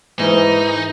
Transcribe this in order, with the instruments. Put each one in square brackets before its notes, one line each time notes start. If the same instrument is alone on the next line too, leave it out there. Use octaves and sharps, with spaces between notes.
[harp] G#2 A#4 [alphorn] E3 [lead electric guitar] D#4